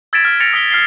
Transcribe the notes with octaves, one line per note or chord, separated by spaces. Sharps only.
E6 G#6 A6 B6 D7 E7
F6
A6 A#6 C#7 D7 F7
D#6 E6 B6 G7
F6 C7 G7